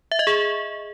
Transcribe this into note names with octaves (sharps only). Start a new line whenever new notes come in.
E5
D#5
G#4